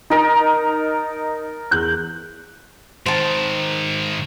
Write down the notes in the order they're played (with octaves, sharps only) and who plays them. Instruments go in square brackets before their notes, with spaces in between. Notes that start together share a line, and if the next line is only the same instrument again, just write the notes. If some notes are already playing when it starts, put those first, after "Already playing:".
[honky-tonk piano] D#4 [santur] A#4 A5
[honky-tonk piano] E2 F#6 G6
[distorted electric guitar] G#2 D#3 [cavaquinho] C5 A5